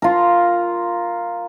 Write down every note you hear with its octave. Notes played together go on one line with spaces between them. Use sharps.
F4 A#4